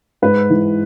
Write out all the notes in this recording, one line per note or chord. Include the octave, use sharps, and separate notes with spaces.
G#2 B4
E3